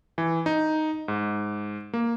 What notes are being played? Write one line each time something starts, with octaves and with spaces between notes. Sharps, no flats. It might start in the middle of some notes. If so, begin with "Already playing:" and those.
E3
D#4
G#2
A#3